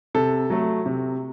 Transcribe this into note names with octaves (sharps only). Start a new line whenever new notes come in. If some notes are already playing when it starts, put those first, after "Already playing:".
C3 A4
F#3 A3
C3